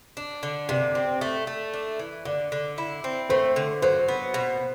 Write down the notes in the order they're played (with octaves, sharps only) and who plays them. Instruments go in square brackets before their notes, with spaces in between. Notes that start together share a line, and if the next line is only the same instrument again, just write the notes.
[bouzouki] D4
D3
[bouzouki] C3 [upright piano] D5
[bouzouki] C4
A3
A3
D4
E3
[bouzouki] D3 [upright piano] D5
[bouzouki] D3
E4
C4
[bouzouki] A3 [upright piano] C5
[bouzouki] D3
[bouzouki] F#3 [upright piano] C5
[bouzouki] B3
B2